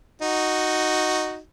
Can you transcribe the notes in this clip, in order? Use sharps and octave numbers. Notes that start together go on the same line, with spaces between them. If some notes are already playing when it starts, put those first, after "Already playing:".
D#4 F#4